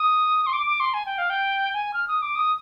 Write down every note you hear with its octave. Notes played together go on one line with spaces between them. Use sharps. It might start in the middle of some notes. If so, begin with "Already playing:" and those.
Already playing: D#6
C6
D6
D6
C6
G#5
G5
F5
G5
G#5
F6
D#6
D6
D#6